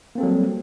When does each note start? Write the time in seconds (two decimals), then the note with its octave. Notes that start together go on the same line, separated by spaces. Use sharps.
0.15 A#3
0.18 C4
0.20 A4
0.23 F#3
0.26 G3